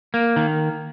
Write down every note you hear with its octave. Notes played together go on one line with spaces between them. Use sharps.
A#3
D#3